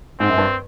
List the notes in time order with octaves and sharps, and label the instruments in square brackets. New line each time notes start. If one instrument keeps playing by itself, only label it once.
[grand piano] G#2 [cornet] C4
[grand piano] F#2
G2